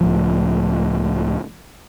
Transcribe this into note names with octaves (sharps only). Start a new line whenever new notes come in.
C#2 A2 F3